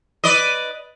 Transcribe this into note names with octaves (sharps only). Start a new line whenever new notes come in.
B4 D5 D#5